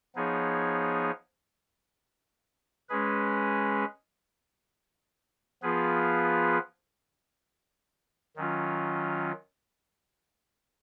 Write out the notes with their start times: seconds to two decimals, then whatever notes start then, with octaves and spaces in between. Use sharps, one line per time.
0.16 F3 B3 D#4 G#4 C#5
2.89 G#3 C#4 G#4 B4
5.63 F3 B3 F4 G#4 B4
8.36 D#3 F#3 C#4 F4